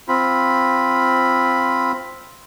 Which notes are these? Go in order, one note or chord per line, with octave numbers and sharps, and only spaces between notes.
C4 F4 B5